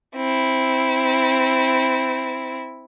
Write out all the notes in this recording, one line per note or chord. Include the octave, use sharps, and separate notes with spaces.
C4 E4